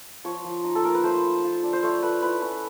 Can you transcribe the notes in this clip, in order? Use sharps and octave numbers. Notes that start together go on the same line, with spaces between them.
F3 C#5
F3
D#4
A4
A#3 A#4
B4
A3 C5
A3
F4
D4
C5
A3 C#5
A3 B4
E4 B4
C#4 B4